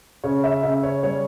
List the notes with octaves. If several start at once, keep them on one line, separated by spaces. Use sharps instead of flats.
C#3 C#5
E5
C#3 E5
C#5
G3 C#5